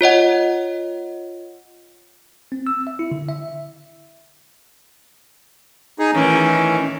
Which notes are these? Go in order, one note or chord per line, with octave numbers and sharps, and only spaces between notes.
F4 C#5 D#5 F#5
C4
E6
E5
E4
D3
E5
D#4 G#4
A2 D#3 E3 C#4